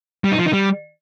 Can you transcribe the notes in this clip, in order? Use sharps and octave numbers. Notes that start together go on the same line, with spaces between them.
G3
D#4
F3
D#4
G3